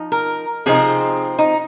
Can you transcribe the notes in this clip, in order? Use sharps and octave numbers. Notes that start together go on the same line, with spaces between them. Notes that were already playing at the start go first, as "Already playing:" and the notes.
Already playing: F3 D#4
A#4
C3 F3 C4 D#4 G#4
D#4